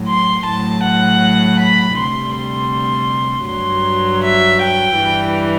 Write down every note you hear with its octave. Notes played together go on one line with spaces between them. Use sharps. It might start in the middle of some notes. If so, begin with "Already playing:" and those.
Already playing: A2 F#3
C6
A2 F#3 A5
F#5
B5
D2 C3 G3 C6
C6
G2 F#3 C6
E5
G5
G2 E3 G3